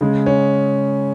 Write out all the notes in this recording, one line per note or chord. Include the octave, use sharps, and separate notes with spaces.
C#3 G#3
C#4